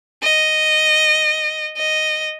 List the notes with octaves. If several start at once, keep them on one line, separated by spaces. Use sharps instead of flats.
D#5
D#5